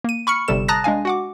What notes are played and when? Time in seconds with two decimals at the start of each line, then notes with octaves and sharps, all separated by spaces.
0.04 A#3 D#7
0.27 B5 C#6 F6 C#7
0.48 G1 C3 G3 A4 E7
0.68 A5 A#5 D#6 F#6 A6 A#6
0.84 G#3 D4 F5 G#5
1.05 F#4 F#5 D6